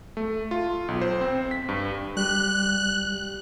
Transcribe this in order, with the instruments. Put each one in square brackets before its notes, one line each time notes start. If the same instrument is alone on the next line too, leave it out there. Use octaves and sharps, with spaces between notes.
[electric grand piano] A3
F4
B1
C5
C4
B6
G2
[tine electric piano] G3 G4 [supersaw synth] F#6